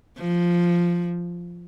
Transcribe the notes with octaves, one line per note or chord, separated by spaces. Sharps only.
F3